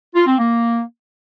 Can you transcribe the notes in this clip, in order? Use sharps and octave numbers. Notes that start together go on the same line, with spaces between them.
F4
C4
A#3